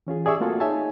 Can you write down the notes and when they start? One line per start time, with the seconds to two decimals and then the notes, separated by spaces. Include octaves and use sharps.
0.07 E3 C#4 F4 G#4
0.25 G4 G#4 D5 E5 C#6 E6
0.40 A3 A#3 C4 F4 F#4 A4
0.60 D#4 G#4 C#5 E5 G#5 A5